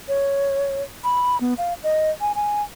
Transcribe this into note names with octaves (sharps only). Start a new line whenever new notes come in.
C#5
B5
B3
F5
D#5
G#5
G#5